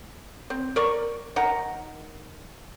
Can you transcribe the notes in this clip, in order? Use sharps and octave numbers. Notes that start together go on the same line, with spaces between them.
C4
A#4 D5 C#6
D#3 F#5 A#5